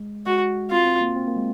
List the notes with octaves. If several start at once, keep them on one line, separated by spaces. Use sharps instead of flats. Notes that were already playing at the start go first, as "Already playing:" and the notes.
Already playing: G#3
G#3 F#4
C4 F4
C4
A#3
C4
A#3
G#3